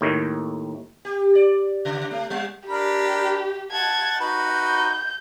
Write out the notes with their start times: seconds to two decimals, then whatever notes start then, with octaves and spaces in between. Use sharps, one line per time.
0.01 D#2 A2 D#3
1.05 G4
1.35 D5
1.85 C#3
2.11 A3
2.30 G3
2.69 D4 G4 A#4 B5
3.71 F#5 A5 G#6
4.20 D#4 F#4 B4 G6